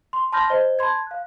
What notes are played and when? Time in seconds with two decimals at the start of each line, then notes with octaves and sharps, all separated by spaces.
0.13 C6
0.32 A5 B5 C6 F6 G6 A#6
0.50 C5 D#5 G7
0.79 A5 B5 C6 G#6
1.07 F5 F#6